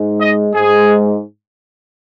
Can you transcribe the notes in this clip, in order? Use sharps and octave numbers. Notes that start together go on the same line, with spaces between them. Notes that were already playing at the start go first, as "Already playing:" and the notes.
Already playing: G#2 G#3
D#5
G#2 G#3 G#4